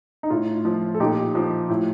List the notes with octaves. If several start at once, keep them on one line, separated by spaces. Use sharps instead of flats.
D#4
A2 F4
F3
A4
A#2 D#4 G4
F3
A2